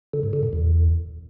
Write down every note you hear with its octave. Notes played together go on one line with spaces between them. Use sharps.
D3
G#2
D3
A#2
E2